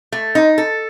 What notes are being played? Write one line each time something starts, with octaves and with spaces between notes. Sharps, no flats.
A3
D#4
A4